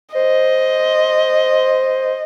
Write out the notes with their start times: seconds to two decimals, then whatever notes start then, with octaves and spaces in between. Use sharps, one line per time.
0.14 C5 D#5